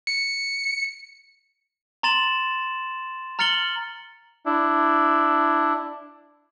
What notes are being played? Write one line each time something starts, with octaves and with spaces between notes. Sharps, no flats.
C#7
A#5 C6 A6 E7 F#7
A#5 F6 A6 C#7 F#7 G7
D4 E4